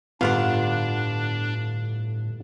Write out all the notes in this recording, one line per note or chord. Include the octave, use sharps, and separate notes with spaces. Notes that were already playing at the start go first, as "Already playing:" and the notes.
G1 A2 B3 D4 F4 D5 F5 F#5